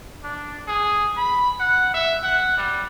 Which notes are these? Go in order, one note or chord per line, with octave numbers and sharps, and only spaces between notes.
D4
G#4
B5
F#5
E5
F#5
G3